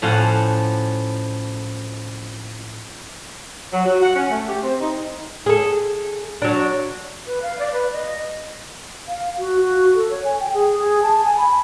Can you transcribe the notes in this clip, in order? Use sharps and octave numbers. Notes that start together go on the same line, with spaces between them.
A2 F3 C#4 F4 F5 F#5
F#3
F#4
F#5
C#4
A3
G4
C4
D#4
G#4 A4
F#3 D4
B4
F5
D5
B4
D#5
F5
F#4
F#4
A4
C#5
G#5
G5
G#4
G#4
A5
G#5
B5